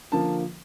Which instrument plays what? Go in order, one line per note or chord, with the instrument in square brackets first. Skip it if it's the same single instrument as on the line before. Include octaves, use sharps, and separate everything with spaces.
[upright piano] D3 F3 A#3 A5